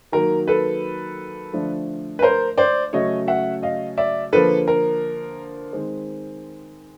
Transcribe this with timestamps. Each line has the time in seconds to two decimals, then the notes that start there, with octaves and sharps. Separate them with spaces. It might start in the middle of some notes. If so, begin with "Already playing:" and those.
0.12 D#3 F#3 A#3 A#4
0.48 A4 B4
1.53 D3 F3 A3 D4
2.19 B4
2.22 A#4 C5
2.58 C5 D5
2.93 C#3 F#3 A3 C#4 C#5 D#5
3.28 E5 F#5
3.63 D#5 F5
3.98 D5 E5
4.32 D3 F3 A#3 A4 B4
4.68 A#4
5.73 D#3 G#3 C4